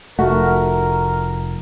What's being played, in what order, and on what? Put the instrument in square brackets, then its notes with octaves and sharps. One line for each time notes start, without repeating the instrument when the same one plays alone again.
[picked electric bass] F1 A3 [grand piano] F#4 [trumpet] A#4